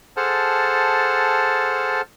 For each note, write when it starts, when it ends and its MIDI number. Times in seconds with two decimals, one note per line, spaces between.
0.17 2.01 68
0.17 2.01 69
0.17 2.01 72
0.17 2.01 78
0.17 2.01 81
0.17 2.01 89